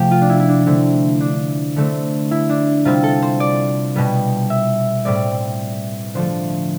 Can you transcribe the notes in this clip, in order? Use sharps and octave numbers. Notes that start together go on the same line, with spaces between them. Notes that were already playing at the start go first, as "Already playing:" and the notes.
Already playing: C3 F3 A3 G4
F4
D4
E4
E4
D4
D3 A3 C4 E4
D4
D3 A3 C4
E4
D4
C3 G3 C4 F4
A4
C5
D5
B2 G3 B3
E5
A2 G3 C4 D5
D3 F3 A3 C5